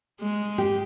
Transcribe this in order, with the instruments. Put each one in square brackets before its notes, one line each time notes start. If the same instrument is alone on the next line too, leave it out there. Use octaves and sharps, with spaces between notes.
[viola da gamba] G#3
[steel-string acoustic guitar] G4